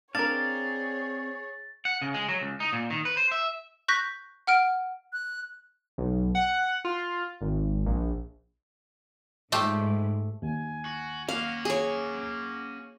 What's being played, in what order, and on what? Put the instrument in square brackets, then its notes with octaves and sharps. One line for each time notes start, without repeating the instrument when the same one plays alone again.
[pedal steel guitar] C4 D5 F5 [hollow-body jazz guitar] D4 A#4 [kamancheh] G#4 C#5 [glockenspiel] A6
[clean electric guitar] F#5
C#3
G#3
F#3
C#2
D#4
A#2
D#3
B4
C5
E5
[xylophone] C#6 F#6 G6 A#6 B6
F#5 F6 D7
[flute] F#6
[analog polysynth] B1
F#5
F4
G#1
A#1
[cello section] G#2 [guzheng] A3 F4 G4
[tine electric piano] D#2 [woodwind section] G#5
[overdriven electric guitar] F#4
[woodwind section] A#3 [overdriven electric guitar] C#4 F#4 [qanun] F5
[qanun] G#4 C#5